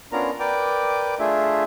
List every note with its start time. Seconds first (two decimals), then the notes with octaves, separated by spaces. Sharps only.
0.12 B3 C#4 D4 F4 A#4 A#5
0.40 A#4 B4 D5 G5 D6
1.19 A3 D4 F4 G#4 E5